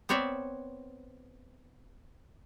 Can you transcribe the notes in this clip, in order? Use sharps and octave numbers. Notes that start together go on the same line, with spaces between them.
B3 C4 C#5 D5 E5